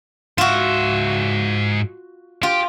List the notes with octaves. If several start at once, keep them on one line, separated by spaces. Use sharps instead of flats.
G#2 F4 F#4 E5
F4 G4